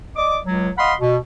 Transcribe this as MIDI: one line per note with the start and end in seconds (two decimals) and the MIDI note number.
0.15 0.37 74
0.15 0.37 75
0.15 0.37 86
0.46 0.68 37
0.46 0.68 54
0.78 0.93 75
0.78 0.93 77
0.78 0.93 78
0.78 0.93 83
0.78 0.93 84
1.00 1.16 47